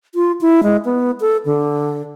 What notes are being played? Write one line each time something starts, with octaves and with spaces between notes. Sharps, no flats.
F4
E4
G#3
B3
A4
D3